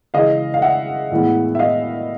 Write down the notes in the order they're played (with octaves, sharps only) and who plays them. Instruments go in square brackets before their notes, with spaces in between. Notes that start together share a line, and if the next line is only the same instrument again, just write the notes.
[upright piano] C#3 E3 G#3 D#5 F5
F5
E5 F#5
A2 E3 G#3 B3
E5
D#5 F5